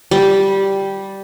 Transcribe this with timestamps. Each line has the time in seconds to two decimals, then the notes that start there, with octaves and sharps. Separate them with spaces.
0.11 G3